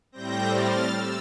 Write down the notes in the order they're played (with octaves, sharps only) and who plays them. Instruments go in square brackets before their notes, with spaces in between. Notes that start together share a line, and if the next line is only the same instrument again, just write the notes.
[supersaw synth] A2 G3 C4 G6 A#6
F6 A6
E6